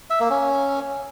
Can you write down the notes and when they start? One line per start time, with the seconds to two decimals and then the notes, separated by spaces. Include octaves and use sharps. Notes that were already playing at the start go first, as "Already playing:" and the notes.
0.10 E5
0.20 A#3
0.30 C#4